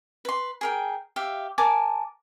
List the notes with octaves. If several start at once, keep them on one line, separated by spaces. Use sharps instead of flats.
B4 C6
G#4 A#4 G5
G4 E5 F5
A#4 G#5 A5 D6